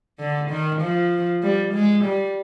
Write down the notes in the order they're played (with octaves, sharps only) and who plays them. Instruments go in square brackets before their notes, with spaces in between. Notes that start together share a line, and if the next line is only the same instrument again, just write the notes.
[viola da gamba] D3
D#3
F3
G3
G#3
G3